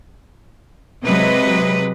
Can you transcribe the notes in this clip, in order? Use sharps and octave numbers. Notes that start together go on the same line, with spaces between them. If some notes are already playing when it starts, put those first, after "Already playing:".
C3 F#3 G#3 B4 D#5